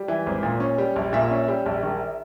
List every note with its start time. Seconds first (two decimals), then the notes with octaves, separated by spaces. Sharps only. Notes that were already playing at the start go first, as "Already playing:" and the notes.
Already playing: G3
0.08 E3
0.26 G#1
0.43 A#2
0.60 C#4
0.78 G3
0.96 A#1
1.13 A#2 E5
1.31 C#4
1.48 G3
1.66 A#1
1.83 D#3